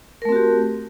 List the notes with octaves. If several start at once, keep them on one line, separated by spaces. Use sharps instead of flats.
A3 C4 F#4 G4 A#4